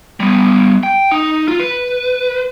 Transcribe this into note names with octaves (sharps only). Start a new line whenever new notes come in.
G3 B3
G5
D#4
F4
B4